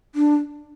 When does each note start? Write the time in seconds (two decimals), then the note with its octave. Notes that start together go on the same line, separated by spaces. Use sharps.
0.15 D4